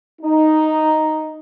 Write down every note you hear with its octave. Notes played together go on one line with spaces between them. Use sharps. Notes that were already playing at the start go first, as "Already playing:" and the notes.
D#4